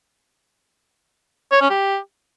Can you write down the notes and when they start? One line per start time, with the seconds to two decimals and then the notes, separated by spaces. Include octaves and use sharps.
1.52 C#5
1.61 C#4
1.70 G4